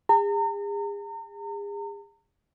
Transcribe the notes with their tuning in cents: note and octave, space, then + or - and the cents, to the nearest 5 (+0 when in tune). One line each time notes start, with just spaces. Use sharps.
G#4 -40 A#5 -40